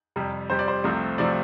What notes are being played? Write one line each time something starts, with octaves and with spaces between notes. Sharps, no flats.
F2 C3 G3
F2 C3 G3 C5
D5
C5
C2 C3 F3 A3 C4
C3 F3 A3 C4 D5